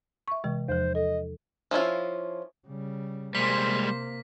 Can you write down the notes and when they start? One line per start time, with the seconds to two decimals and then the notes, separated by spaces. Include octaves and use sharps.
0.28 E5 C#6
0.44 C3 E3 G#3
0.68 E2 F3 C5
0.95 A4 D#5
1.71 F3 C#4 E4 F4
2.67 C#3 G3
3.35 C3 G3 G#3 A#3 C5 B6